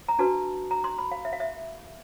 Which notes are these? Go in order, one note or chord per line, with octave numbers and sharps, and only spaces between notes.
A#5
D4 F#4 B4 A5
A#5
C6
B5
F5
E5
F5
E5